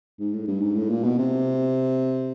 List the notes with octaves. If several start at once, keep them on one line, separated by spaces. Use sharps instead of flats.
G#2
A2
G2
G#2
A2
A#2
B2
C3